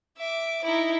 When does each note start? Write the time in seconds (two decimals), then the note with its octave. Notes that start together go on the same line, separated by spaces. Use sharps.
0.17 E5 D6
0.64 D#4 E4